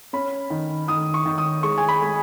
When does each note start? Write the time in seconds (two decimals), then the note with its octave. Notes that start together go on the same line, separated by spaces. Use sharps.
0.13 C#4 B5
0.50 D#3
0.88 D#3 D#6
1.14 C#6
1.25 D#3
1.38 D#6
1.63 G#3 C#6
1.78 G#5
1.88 B5
2.02 G#3